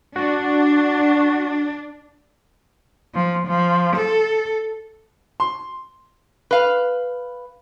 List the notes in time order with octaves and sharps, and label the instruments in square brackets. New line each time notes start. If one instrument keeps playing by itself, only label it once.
[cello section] D4 [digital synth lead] F#4
[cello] F3
F3
A4
[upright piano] C6
[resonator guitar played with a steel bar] B4 F5